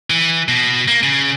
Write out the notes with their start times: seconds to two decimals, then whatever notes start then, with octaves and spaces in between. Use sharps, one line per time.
0.10 E3
0.48 B2
0.88 A#3
1.03 C#3